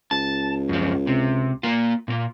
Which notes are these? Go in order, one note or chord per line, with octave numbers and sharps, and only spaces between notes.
C#2 A5
F#2 F3
C3
A#3 F4
A#2 A#3